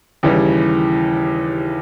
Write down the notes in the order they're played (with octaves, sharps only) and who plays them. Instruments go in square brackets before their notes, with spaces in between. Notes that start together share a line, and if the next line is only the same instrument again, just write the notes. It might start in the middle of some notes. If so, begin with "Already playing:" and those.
[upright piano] D#2 C#3 E3 G3